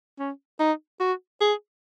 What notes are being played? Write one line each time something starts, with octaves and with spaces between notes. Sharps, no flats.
C#4
D#4
F#4
G#4